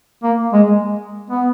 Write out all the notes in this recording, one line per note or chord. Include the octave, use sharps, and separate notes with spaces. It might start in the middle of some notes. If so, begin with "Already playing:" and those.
A#3
G#3
B3